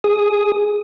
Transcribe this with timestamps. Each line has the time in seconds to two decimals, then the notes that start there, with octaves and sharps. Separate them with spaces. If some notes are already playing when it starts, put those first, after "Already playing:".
0.04 G#4 D#6